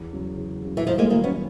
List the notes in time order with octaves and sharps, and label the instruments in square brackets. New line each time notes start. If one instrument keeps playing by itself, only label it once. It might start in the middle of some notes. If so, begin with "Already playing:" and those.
Already playing: [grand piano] E2
C#3 F#3
E2
C#3 F#3
[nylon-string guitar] E3
[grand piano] G2 [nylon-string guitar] D#3 F3
[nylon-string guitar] G#3 A#3
[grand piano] D#3 F#3 B3 E4 [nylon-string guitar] G#3 A#3
[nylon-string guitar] B3 C#4